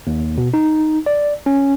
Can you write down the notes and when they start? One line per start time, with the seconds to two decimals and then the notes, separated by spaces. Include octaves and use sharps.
0.07 D#2
0.38 B2
0.54 D#4
1.06 D5
1.46 C#4